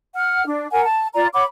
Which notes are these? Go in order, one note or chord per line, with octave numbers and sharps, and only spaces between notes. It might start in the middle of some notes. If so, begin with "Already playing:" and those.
F#5 F6
D4
A#4 F#5 G#5
A5
F4 D5 A#5
C#5 F#5 B5 D6